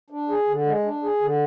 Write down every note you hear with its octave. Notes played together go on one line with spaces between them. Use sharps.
D4
G#4
D3
G#3
D4
G#4
D3